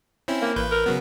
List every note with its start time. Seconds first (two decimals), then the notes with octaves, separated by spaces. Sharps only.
0.28 C4 C#4 E4
0.42 A#3
0.56 A1 B4 G6
0.71 A#4
0.86 C#3 F#3 B3